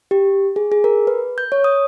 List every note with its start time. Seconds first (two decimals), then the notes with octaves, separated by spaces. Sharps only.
0.11 G4
0.56 G#4
0.72 G#4
0.84 A#4
1.07 B4
1.38 G6
1.52 C#5
1.64 D#6